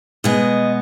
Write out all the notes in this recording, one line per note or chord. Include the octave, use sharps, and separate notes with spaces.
B2 G#3 B3 D#5